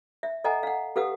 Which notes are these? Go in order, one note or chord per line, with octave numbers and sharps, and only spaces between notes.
E5
A4 D#5 F#5 G#5 A#5
F5 F#5
G4 A4 B4 F5 F#5 D#6